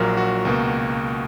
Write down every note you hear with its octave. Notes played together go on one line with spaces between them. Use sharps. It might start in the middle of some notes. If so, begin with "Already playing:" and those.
Already playing: A#1 A#2 F#3 A#4
F#4
C#2 B2 A#3